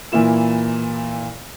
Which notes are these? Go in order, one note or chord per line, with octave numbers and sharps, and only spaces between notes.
A#2 E3 A#3 E4 E7